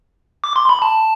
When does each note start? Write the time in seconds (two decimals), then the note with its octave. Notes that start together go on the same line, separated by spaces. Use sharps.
0.44 D6
0.56 C6
0.69 B5
0.82 A5